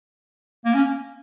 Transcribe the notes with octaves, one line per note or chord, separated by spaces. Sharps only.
A#3
C#4